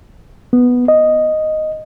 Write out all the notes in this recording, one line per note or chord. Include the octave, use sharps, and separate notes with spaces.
B3
D#5